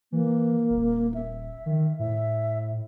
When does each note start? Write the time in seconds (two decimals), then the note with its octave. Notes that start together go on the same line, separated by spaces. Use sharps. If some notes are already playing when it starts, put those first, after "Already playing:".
0.12 E3 A#3
0.70 D#1
1.14 E5
1.66 D#3
1.99 A2 E5